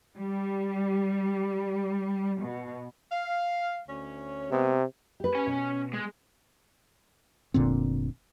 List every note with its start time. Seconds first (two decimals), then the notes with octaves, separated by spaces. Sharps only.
0.17 G3
2.41 B2
3.12 F5
3.88 D2 C#4
4.51 C3 G#3 B3
5.20 G4 B4
5.35 C#4 G#5
5.47 B2
5.94 G#3
7.54 F1 A#2 D3 C4